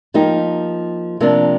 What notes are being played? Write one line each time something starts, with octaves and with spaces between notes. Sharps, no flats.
F3 A#3 D#4 G4
C3 F3 A#3 D4